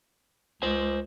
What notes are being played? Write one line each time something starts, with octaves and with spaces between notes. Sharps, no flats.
C#2 C5 G#5